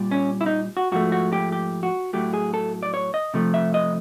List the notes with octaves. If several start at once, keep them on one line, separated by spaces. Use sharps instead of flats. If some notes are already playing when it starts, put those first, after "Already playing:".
Already playing: A#2 G3
C#4
E4
D#4
F#4
G#2 F3 A3 F#4
F#4
G4
G4
F#4
A2 F#3 A3 G4
G#4
A4
D5
C#5
D#5
C3 F3 A3
E5
D#5